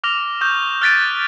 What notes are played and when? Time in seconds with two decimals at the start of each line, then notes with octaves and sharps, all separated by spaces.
0.04 D6 F6 A#6 F7
0.41 C#6 D#6 G6
0.82 F6 F#6 A6 B6 D7 D#7